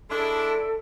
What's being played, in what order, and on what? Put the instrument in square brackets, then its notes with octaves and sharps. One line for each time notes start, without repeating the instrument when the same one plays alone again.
[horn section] G#3 D4 E4 [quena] A4